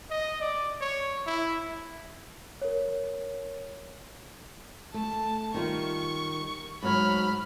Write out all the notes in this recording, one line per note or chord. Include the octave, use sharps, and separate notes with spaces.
D#5
D5
C#5
E4
A#4 C#5
A3 A5
D#3 G3 F4 C#6
G#2 F#3 C#5 B5 F6